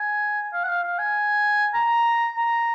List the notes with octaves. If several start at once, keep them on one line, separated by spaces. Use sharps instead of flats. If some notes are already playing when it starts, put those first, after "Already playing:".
Already playing: G#5
F5
F#5
F5
F5
G#5
A#5
A#5